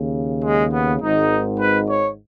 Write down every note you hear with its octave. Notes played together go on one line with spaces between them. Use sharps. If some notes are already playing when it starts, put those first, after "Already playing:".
Already playing: D#2 C#3
G#3
B3
G#1 G#2 D#3 D#4
B4
C#5